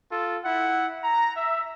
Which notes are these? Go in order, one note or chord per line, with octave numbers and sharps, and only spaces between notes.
F4 A4
E4 F#5
A#5
E5